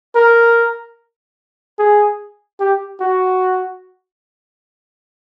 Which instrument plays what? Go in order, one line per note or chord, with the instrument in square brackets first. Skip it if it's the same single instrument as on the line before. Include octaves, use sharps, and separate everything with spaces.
[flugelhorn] A#4
G#4
G4
F#4